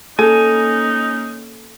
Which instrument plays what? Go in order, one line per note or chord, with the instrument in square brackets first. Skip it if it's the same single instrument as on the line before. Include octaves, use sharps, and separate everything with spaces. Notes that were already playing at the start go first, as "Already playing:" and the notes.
[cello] A#3 C#4 [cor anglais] D#4 [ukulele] A4 [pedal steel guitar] G#5